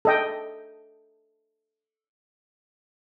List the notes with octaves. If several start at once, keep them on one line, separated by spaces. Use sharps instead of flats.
A4 D#5 G5